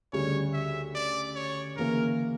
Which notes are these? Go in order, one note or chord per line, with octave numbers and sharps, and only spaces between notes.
D2 C#3 G3 C#5
E5
D5
C#5
D2 C#3 E3 A#3 A#4